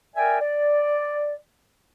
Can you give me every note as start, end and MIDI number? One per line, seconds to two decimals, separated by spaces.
0.15 0.37 70
0.15 0.37 74
0.15 0.37 76
0.15 0.37 79
0.15 0.37 80
0.40 1.35 74